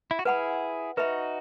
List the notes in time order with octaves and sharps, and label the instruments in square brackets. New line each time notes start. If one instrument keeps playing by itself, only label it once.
[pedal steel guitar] E4
F#4
[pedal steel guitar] E4 G#4 [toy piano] B4 F#5 B5
[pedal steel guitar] D#4 F#4 [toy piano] B4 E5 B5